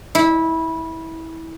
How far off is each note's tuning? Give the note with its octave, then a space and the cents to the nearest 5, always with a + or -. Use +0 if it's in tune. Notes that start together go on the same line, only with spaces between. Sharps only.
E4 -20